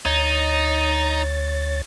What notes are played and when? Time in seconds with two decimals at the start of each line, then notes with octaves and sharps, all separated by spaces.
0.05 D2 D#4 C#5 A6